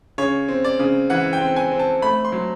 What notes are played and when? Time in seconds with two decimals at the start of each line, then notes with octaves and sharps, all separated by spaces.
0.18 C#3 C#5
0.48 C4
0.64 D5
0.79 C#3
1.10 E3 F#5
1.33 G5
1.41 C4
1.56 G#5
1.71 C4
1.79 A5
2.02 A3 B5
2.25 C6
2.32 F#3